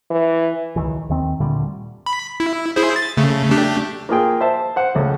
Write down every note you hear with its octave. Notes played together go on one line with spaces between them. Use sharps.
E3
C#2 D#3 E3
D#2 D#3 C4
D2 A#2 D3 G3
B5
E4
E4 G#4 C5
A6
C#3 A3
A3 D4 G4
A#3 F4 G#4 G5
C5 E5 A5
C5 F#5
C#2 A3